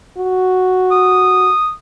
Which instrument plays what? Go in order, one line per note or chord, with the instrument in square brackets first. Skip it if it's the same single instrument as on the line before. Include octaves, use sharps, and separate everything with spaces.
[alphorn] F#4
[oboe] D#6